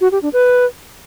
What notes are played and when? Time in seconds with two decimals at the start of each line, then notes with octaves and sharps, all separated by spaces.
0.01 F#4
0.12 G4
0.22 D4
0.33 B4